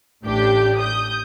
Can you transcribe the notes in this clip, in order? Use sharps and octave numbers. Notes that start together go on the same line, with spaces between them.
A1 A2 D4 G4 G6
D#6 G6